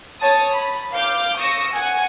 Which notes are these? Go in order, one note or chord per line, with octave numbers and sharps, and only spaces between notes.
C#5 A5 D#6
B5
F5 D6 F6 G6
C#6 D#6 E6 A#6 C#7
F#5 G#5